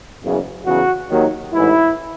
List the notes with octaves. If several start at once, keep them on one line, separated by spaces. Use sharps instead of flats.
F#1 E2 C#3
E2 C#3 F#3 F#4
D#2 D#3 F#3
A1 G#2 E3 E4